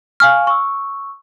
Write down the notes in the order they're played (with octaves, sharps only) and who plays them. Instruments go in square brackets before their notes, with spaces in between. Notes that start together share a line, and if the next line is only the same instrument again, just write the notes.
[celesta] F5 G#5 C#6 [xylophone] F6
[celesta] C#6 E6